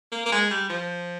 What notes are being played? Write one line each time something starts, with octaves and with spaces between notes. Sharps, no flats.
A#3
A#3
G#3
G3
F3